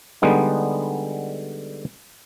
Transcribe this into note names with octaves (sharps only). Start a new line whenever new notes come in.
D3 G3 G#3 B3 D#4